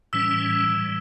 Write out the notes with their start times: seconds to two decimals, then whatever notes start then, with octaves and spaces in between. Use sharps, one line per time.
0.13 A2 E3 G3 C#4 E6
0.68 A2 E3 G3